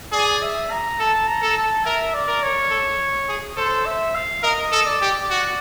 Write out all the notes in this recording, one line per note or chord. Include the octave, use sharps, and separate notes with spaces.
G#4 D5
E5
A#5
A4 A5
A#5
A4
A5
A#4 E5
D5
A#4
C#5
A4
G#4
A4 C5
E5
F5
A#4 D#5
A4
D5
G4
F#4